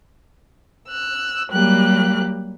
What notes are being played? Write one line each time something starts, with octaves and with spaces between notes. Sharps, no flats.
E6 F#6
F#3 G3 A#3 G4 F#6